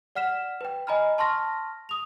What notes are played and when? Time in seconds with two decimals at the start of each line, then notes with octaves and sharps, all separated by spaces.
0.15 D5 F#5 F6 B6 E7
0.61 B4 G5
0.87 D#5 G#5 A#5 B5 F6
1.18 A5 C6 C#6 F6 A#6
1.89 D#6 F7